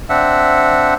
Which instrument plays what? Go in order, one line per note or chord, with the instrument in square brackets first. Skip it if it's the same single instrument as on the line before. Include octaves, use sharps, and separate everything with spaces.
[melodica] C4 D4 E5 F#5